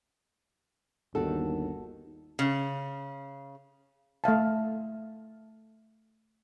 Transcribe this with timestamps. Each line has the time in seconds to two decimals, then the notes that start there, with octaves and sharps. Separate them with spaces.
1.15 G1 D#2 D#3 F#4 A4
2.39 C#3
4.24 A3 E5 F5 A5